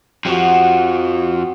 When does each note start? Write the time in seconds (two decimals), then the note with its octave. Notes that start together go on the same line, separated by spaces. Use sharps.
0.25 F2 F3 F#4 G4